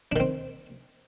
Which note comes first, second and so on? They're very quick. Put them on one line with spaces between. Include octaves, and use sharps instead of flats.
D4 D#3 C4